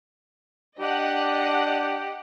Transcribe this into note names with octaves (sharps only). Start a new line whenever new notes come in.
D4 G4 D#5 F#5